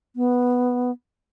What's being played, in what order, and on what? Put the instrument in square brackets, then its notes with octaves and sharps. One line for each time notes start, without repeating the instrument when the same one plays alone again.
[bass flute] B3